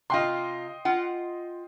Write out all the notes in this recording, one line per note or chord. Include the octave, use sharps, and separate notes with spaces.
C3 F4 D#5 G5 C6
F4 F#5